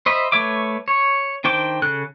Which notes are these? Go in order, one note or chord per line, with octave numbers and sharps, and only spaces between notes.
C5 D#5 E5 B5
A3 B4 C#5 E5 D6
C#5
D#3 D4 C5 G5 D6
C#3 A4 F#6